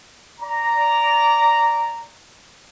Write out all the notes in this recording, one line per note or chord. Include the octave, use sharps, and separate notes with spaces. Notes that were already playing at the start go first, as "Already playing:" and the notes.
D5 A#5